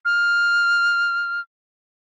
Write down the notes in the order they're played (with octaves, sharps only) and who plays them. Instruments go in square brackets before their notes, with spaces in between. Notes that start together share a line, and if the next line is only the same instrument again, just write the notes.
[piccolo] F6